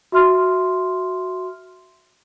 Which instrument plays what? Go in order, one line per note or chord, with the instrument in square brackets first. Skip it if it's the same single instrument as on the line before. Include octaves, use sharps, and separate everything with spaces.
[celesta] F#4 E5 C6 F6